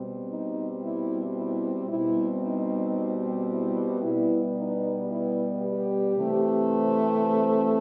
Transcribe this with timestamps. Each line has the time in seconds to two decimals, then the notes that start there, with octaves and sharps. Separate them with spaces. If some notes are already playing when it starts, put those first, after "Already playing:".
Already playing: B2 G3 C4
0.29 D#4
0.82 E4
1.36 E4
1.89 B2 G3 C4 E4
2.42 D#4
3.48 E4
4.02 B2 G3 B3 E4
4.56 D#4
5.09 E4
5.62 G4
6.16 C3 E3 A3 C4
7.22 A4